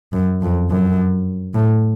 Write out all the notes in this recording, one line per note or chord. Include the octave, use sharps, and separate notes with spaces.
F#2
F2
F#2
A2